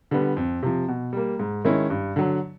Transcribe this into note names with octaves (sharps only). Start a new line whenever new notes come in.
D3 G3 B3
F2
C3 F3
B2
G3 A#3
G#2
D#3 G#3 C#4 E4
G2
D3 F#3